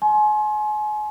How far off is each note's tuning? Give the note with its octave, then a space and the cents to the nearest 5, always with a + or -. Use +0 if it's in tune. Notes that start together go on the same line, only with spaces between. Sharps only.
G#5 +35 C6 +30